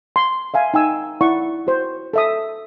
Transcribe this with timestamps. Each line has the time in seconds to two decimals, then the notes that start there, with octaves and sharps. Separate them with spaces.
0.16 C6
0.54 E5 F5 G#5
0.74 D#4 G5 G#5 E6
1.21 E4 D5 F#5 C#6
1.67 F#4 C5
2.13 A4 E5 D#6